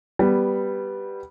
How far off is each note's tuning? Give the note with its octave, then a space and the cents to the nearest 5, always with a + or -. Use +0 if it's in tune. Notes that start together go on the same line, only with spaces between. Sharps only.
G3 +0 B3 +0